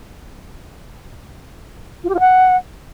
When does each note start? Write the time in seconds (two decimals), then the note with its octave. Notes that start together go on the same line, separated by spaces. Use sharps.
2.04 F4
2.09 G4
2.14 F4
2.20 F#5